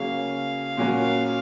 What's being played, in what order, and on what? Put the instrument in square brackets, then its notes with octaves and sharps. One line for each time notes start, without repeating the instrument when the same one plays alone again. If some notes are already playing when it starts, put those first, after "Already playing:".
Already playing: [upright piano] C#3 F#3 A#3 C#4 [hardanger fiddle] F5
[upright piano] A#2 F#3 C#4 F#4 A#4